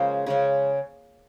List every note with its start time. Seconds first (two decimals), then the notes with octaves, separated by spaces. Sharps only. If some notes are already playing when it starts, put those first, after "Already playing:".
Already playing: C#3 F3 G#3 A#3 C#4 A#4 C5
0.26 C#3 G#3 C#4